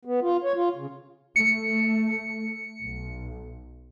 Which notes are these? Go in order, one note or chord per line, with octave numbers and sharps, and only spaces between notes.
B3
F4
C#5
F4
C#3
A3 C#7
B1